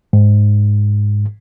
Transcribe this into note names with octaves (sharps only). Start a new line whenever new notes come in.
G#2